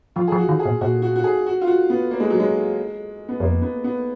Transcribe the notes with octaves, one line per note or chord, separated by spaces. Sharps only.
F3 F4
F3 G#4
F#4
D#3
G#4
A#2
A#2 F#4
F#4
F#4
G#4
F#4
F4
F#4
B3
A#3
G#3
F#3
G#3
B3
F2 A#3
B3
B3